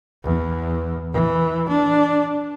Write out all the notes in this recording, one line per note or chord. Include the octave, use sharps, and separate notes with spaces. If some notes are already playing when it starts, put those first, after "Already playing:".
E2
E3
D4